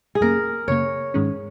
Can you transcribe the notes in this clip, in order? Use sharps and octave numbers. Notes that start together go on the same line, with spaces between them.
G#4
F#2 C#3 A#3 A#4
F#2 C#3 A#3 C#5
G#2 D#3 G#3 C#4